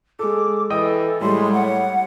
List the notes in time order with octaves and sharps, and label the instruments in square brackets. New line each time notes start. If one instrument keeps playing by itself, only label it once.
[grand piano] G#3 A4 [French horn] G#4 [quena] D6
[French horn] E3 [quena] A4 [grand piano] D#5 G5 D#6
[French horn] A2 [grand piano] G3 [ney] G#3 [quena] C6
[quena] C#5 [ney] F#5